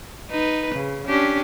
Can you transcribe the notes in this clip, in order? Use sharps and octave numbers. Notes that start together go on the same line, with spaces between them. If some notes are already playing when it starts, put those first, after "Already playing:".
D#4 B4
C#3
C#4 D4 G4